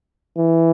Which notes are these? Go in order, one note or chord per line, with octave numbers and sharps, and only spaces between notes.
E3